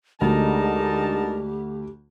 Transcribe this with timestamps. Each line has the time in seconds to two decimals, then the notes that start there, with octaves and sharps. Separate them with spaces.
0.21 D2 D3 G#3 D#4 G4 A#4 A5